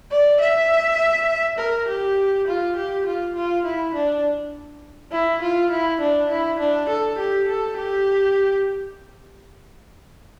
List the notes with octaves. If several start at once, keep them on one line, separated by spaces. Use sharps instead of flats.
D5
E5
A#4
G4
F4
G4
F4
F4
E4
D4
E4
F4
E4
D4
E4
D4
A4
G4
A4
G4